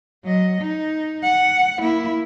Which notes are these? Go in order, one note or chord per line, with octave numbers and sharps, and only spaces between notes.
F#3 D#5
D#4
F#5
A#3 E4